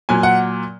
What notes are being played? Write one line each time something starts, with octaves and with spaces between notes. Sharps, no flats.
A#2 F#3 G#5
F#5